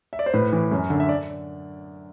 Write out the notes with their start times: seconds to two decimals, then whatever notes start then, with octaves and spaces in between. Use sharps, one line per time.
0.13 E5
0.19 D5
0.26 C5
0.34 A2 B4
0.53 E3
0.71 F#2
0.90 D3
1.00 E5
1.09 D5